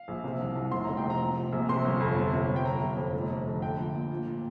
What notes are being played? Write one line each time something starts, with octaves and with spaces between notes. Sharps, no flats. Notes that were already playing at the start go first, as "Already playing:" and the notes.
Already playing: F5
A#1
C3
C2
C2
F1 C6
F1 A#5
G5
C3
A#5
A#2
A#2
A#1
C3 C6
G1
F2
G1
C3
G1
G5
G1 A#5
G1
F2
F1
F2
D3
A#1 G5
A#2
A#2
A#2
A#2